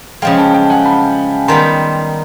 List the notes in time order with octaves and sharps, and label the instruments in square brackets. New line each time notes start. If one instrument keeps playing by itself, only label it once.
[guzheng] C#3 F3 G#3 [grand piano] F5 G5
[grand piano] G5 A5
G5 A5
F#5 G#5
A5 B5
[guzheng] D#3 G3 B3 [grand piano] A#5 C6